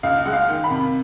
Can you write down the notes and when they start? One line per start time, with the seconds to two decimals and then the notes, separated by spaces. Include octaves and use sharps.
0.03 C#2 F5
0.25 G#3 F#5
0.33 F5
0.48 D#3
0.64 B5
0.71 C3